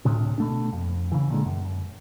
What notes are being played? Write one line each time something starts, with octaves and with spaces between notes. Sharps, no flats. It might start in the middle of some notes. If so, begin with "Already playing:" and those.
D2 A2 C3
B2 A3 D4
F2
C#3 E3
A#2 D3 G#3
F#2